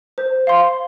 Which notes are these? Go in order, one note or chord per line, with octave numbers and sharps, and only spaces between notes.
C5
F5 C6